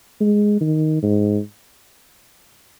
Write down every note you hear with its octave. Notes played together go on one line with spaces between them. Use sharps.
G#3
D#3
G#2